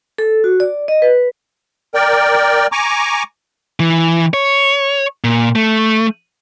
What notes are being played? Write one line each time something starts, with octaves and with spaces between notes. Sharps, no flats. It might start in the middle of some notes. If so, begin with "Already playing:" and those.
A4
F#4
D5
D#5
B4
A#4 D5 G5
G#5 A#5 C#6 D6
E3
C#5
A#2
A3